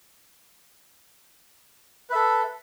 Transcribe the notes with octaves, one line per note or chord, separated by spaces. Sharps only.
A4 B4 E5